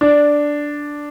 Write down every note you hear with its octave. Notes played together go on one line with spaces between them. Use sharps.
D4